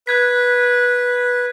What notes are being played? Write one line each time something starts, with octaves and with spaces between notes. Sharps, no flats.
B4 F#6 G#6 B6